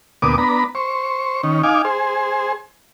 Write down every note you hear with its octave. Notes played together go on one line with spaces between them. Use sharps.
D2 A#2 B3 D6 D#6
B3 D4 A#5 B5
C5 C#6
D#3 C#4
D#4 F5 G#5 D6
G#4 C5